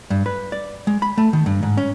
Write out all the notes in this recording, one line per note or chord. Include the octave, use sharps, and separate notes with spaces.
G2
B4
D5
G#3
B5
A3
D#3
G2
G#2
C#4